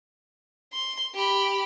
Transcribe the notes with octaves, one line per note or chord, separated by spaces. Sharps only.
C6
G4 B5